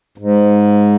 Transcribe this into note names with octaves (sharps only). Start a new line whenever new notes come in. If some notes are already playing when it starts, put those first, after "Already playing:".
G#2